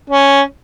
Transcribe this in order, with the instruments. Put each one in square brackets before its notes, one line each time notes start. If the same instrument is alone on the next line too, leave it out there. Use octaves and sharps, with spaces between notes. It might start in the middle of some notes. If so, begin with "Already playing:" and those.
[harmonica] C#4